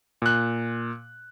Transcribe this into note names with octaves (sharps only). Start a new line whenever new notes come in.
A#2 F#6